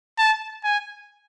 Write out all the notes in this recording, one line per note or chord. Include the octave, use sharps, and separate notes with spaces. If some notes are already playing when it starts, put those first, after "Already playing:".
A5
G#5